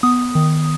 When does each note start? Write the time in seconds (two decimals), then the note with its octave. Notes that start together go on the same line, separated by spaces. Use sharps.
0.03 B3 D#6
0.35 D#3